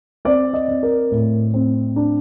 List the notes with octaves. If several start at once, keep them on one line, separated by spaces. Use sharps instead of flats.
C4 D5
D#5
C4
A#4
A2
C4
D4